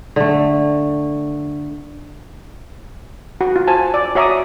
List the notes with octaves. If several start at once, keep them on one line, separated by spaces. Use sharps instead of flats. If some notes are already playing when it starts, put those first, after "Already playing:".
D3 A3
F#4
F4
C5 G#5 A5
D5
F#4 C#5 E5 A#5 D6 D#6